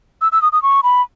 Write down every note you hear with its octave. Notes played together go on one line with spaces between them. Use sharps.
E6
E6
D#6
D#6
C#6
B5